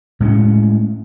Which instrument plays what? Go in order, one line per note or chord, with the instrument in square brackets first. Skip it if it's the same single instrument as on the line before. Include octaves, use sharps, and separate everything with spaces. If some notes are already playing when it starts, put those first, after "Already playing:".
[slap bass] A2 G#3 A#3 C#4